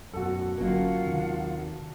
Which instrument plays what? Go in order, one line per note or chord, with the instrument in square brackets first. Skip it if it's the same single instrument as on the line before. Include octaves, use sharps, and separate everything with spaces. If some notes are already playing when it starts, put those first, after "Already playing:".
[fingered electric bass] F#2 B2 [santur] F#4 A4 [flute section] F#5
[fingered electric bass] G1 C#4 [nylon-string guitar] F#3 A#3 [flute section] F4 F5 F#5
[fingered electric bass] D#2 C3 D#3